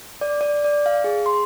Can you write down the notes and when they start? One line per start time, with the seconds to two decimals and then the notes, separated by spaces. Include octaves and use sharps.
0.21 D5
0.41 D5
0.65 D5
0.86 F5
1.04 G#4
1.26 C6